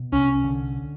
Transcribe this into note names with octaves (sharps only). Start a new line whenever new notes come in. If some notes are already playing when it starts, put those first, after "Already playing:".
Already playing: B2
C2 C#4
D3